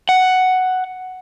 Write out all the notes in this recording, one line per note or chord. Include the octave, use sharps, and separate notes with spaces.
F#5